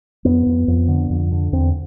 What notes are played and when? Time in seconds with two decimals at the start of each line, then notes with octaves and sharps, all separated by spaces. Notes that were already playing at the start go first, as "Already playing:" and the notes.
0.25 F2 B3
0.46 F2
0.68 F2
0.88 D3
1.10 F2
1.32 D3
1.52 E2 C4